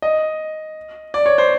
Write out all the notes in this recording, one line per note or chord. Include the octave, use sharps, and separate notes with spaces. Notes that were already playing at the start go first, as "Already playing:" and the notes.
D#5
D5
C#5
C5